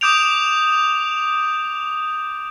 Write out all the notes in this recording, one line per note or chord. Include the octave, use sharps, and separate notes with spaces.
D6 D#6 G6 D7 F7